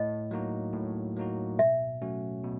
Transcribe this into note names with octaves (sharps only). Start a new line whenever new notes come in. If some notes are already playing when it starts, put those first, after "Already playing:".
Already playing: A2 D#5
F#3 A#3 D#4 F#4
A2
F#3 A#3 D#4 F#4
B2 E5
F#3 A3 C#4 F#4
B2